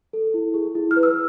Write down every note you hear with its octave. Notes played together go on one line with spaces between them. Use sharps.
A4
E4
G#4
E4
F6
B4
E6